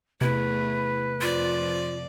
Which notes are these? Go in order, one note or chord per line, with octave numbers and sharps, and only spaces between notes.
E2 C3 A3 E4 B4
F2 F3 F4 D5